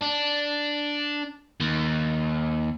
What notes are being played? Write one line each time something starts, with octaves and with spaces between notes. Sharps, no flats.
D4
D#2